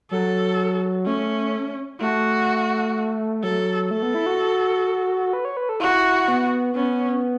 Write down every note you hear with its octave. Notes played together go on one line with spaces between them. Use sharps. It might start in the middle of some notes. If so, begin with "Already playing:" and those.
F#3 A4
A3 C#4
A3 F#4
F#3 A4
A3 A4
B3
E4
F#4
B4
C#5
B4
A4
E4 F#4
B3
B3 C#4